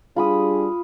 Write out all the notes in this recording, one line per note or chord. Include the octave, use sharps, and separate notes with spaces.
G3 D4 F4 G#4 B5 D#6